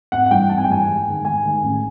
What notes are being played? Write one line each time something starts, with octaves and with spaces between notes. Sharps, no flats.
G#1 F#5
F#5
G2 E3 G3 G5
G#1 A5
G#5
G5
G2 E3 G3 G#5
G#2
D#3 G#3
G#2 G#5
D#3 G#3
A1